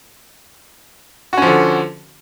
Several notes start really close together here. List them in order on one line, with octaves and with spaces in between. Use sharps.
F#4 C#4 F3 D3